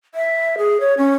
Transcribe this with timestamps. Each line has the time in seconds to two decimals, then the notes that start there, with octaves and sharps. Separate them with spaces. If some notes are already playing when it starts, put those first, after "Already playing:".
0.15 E5
0.58 G#4
0.80 C#5
0.98 C#4